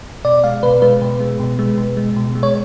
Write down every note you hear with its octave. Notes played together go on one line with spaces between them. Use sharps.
B2 D5
G#3 F5
B2 B4
G#3 B4
B2
G#3
B2
G#3
B2
G#3
B2
G#3
C#5